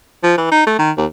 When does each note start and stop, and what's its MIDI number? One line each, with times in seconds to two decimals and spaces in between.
0.23 0.35 53
0.38 0.49 52
0.51 0.63 63
0.67 0.75 57
0.79 0.91 51
0.98 1.06 39